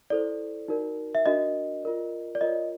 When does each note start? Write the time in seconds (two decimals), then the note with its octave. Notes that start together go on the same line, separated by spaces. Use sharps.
0.10 E4 A4 C5 D5
0.68 D#4 F#4 A#4 D5
1.15 E5
1.26 D4 F#4 A#4 D#5
1.83 F4 A#4 D5
2.35 D5
2.41 F4 A#4 C#5 D#5